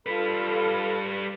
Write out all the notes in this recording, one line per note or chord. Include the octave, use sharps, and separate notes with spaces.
G3 F4 A4 B4 B5